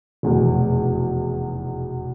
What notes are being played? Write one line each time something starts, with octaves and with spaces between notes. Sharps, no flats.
F1 E2 B2